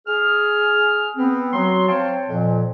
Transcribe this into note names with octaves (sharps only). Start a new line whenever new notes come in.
G#4 F6
B3 C4
F#3 C6
C4 C5 C#5 F5 G5 A5
F2 A#2 F3